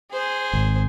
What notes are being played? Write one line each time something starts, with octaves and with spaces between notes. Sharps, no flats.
G#4 C5
G#1